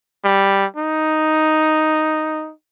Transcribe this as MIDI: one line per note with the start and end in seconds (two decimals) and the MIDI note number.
0.24 0.65 55
0.76 2.52 63